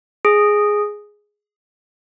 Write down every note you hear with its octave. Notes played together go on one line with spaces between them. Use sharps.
G#4